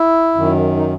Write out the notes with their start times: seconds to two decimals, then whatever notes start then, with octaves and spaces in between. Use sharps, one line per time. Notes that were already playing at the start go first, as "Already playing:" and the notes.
Already playing: E4
0.35 F#2 D#3
0.77 D#4